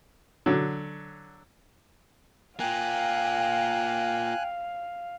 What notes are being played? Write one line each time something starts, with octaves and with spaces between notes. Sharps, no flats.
D3 F#3
A#3 F4 F5 G5 G#5 F#6